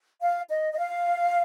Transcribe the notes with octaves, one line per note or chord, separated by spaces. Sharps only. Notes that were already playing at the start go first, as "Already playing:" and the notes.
F5
D#5
D#5
F5